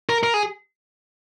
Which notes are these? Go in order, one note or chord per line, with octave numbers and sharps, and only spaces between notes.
A#4
A#4
G#4